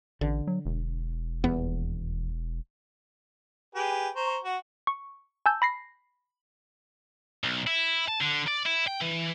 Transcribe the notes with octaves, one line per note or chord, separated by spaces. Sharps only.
A1 D3
F#3
E1
D#1 E2 B3
G4 G#4 B4
C5 A#5 C#6
F#4
C#6
G#5 A5 E6 G6
B5 A#6 C7
B1
E4
A5
D3
D5
E4
G5
E3